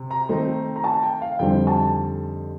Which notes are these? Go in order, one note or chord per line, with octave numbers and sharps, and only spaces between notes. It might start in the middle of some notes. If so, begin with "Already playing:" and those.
Already playing: C3
A#5
D#3 A3 C4 D#4
A#5
A5
G5
F5
F2 D3 G3 C4 D#4 G5
A5